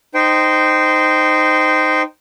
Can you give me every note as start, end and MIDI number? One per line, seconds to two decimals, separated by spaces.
0.14 2.02 63
0.14 2.02 72
0.14 2.02 79